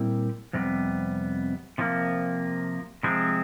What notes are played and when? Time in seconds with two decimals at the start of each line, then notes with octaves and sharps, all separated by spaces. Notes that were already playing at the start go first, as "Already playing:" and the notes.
Already playing: A#2 G3 C4 E4
0.53 F2 C3 G3 B3
1.78 C3 F3 A#3
3.03 C3 F3 G#3 C4